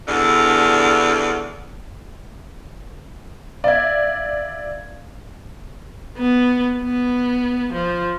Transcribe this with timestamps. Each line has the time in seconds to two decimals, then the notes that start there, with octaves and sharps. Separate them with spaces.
0.08 E2 G2 D3
3.64 D5 E5 F5 G#6
6.17 B3
6.82 B3
7.73 F3